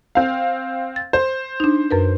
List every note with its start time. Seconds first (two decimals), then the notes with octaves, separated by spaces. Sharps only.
0.15 C4 F5
0.96 A6
1.13 C5
1.60 D4 D#4
1.91 F#2 A#4 B4